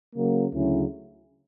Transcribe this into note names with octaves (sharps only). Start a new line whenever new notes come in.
C#3 F#3 A#3
D2 C#3 F#3 C#4 E4